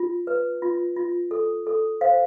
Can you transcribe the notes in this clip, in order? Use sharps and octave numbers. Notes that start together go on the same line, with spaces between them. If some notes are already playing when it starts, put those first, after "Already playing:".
Already playing: F4
B4
F4
F4
A4
A4
C5 F5